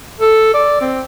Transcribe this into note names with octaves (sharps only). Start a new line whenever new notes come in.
A4
D5
C4